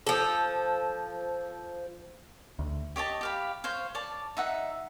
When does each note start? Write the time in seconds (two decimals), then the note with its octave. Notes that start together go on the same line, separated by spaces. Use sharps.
0.07 F3 A4
2.59 D2
2.96 G4 C#5 D#5 A5
3.21 G4 F5 B5
3.64 C5 C#5 F5
3.95 C#5 D5 A5
4.37 D#4 E5 F#5